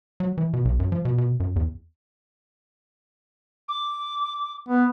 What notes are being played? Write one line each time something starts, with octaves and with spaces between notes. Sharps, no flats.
F#3
E3
B2
B1
F#2
F3
B2
B2
F#2
E2
D6
B3